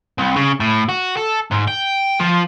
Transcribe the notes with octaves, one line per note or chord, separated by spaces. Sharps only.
C2
C#3
A2
F#4
A4
G#2
G5
F3